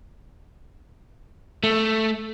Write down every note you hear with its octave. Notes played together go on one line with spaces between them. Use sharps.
A3